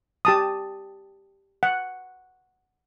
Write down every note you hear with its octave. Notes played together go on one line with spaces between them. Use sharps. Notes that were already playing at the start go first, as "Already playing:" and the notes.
G4 A5 D#6
F#5